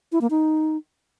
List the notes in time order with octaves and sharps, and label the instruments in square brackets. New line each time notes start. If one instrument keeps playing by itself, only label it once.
[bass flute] E4
A#3
D#4